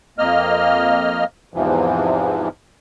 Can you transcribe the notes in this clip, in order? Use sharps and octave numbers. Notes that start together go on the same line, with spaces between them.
F2 A#3 D#5 F6
E2 G#2 C3 E3 F3